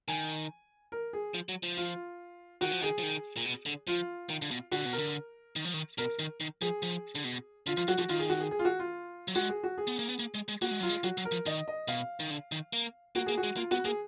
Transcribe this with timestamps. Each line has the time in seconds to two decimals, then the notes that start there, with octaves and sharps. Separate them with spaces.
0.08 D#3 G#5
0.92 A#4
1.13 G#4
1.34 F3
1.49 F#3
1.63 F3
1.77 F4
2.61 D#3 F#4
2.72 F3
2.81 D#3 G#4
2.99 F3
3.03 D#3
3.37 A#2
3.46 B2
3.66 D3
3.87 F3 F4
4.30 D#3
4.42 D3
4.51 B2
4.72 D3 F#4
4.85 B2
4.93 A#4
4.99 D3
5.56 D#3
5.65 F3
5.74 D#3
5.98 B2 A#4
6.19 D#3
6.41 D#3
6.62 F3 G#4
6.83 F3
7.15 D3
7.24 B2
7.67 D3 F4
7.77 F3 F4
7.88 F#3 F#4
7.98 F3 F#4
8.09 D#3 F4
8.19 G#4
8.30 F#4
8.40 G#4
8.51 G#4
8.59 F4
8.65 F#4
8.79 F4
9.28 F#3
9.35 G#3 F#4
9.49 G#4
9.64 F#4
9.78 G#4
9.88 B3
9.99 A#3
10.09 B3
10.19 A#3
10.35 G#3
10.48 G#3
10.62 A#3 F#4
10.71 G#3
10.80 F#3 F4
10.89 G#3
11.04 F#3 F#4
11.18 F#3
11.25 A#4
11.32 F3
11.46 D#3 D#5
11.68 D#5
11.88 B2 F5
12.20 D#3
12.31 D3
12.52 D#3
12.73 A#3
13.16 A#3 F#4
13.26 A#3 G#4
13.37 F#4
13.44 G#3
13.56 A#3 F4
13.71 B3 F#4
13.85 A#3 G#4